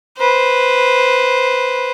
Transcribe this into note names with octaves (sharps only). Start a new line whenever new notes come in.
B4 C5